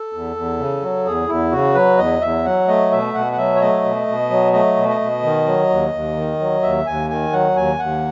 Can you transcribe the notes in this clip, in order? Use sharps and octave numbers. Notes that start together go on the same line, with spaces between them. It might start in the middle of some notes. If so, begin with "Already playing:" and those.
Already playing: A4
E2
E2
C#3
F#3
E2 G#4
E2 E4
C#3 F#4
F#3 B4
E2 D#5
E2 E5
F#3 F#5
A3 D#5
B2 E5
B2 F#5
F#5
F#3 E5
C#5
A3 D#5
B2
B2
F#3
A3 D#5
B2
D#5
B2
D#3
F#3
D#2
D#2
D#3
F#3
D#2 E5
D#2 G#5
D#3 G#5
F#3 F#5
D#2 G#5
D#2 F#5